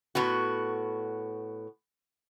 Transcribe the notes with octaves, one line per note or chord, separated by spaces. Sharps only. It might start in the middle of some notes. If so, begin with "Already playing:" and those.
A2 B3 F#4